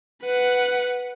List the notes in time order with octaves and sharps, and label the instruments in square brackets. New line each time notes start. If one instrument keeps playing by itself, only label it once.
[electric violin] B4 F#5